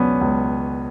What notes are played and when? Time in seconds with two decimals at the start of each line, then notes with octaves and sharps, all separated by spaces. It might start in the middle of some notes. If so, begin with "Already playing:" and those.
Already playing: C#2 B2 F#3 B3 C#4 D4
0.21 C#2